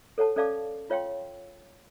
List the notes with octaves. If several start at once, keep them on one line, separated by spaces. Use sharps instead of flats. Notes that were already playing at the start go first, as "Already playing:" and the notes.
A4 C#5 F#5 A5
C#4 A4 D5 F5 A5 D6
F4 C#5 F5 G5 C6